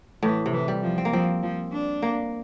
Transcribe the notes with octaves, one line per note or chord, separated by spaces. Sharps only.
A2 E3
C3
E3
G3
F3
C4
A#3
F3 C4
F3
D4
A#3